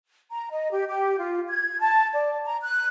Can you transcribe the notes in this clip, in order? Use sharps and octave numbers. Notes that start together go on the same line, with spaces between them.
A#5
D#5
G4
G4
F4
G#6
A5
D5
A#5
F#6